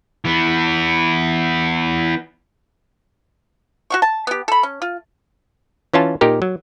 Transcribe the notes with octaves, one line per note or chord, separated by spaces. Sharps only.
E3 B3
F#4 F#5 C#6
A5
B3 G4
A4 B5
C#4
F4
E3 C#4 F4 A5
A#2 D#4 G4 A#4
F#3